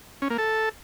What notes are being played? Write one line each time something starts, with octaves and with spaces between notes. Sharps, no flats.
C#4
A#3
A4